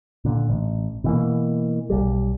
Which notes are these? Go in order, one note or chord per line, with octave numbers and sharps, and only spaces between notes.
A#2 D3
A1
B2 E3 A#3
B1 G3